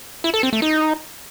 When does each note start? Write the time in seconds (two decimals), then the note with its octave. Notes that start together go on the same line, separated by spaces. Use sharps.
0.24 E4
0.34 A4
0.43 C4
0.53 A3
0.62 D#4